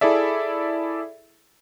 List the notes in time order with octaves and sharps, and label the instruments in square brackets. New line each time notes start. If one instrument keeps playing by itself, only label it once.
[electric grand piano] E4 G#4 A4 D5 E5